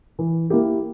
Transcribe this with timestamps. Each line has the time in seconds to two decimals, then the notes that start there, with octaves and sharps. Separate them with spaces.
0.19 E3
0.50 A#3 E4 G4